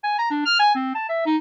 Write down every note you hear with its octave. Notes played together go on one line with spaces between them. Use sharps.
G#5
A#5
D4
F6
G#5
C4
A5
E5
D#4